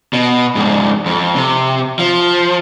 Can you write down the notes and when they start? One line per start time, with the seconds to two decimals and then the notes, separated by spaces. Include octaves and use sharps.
0.13 B2
0.55 F2 G#2
1.06 F2
1.35 C3
1.99 F3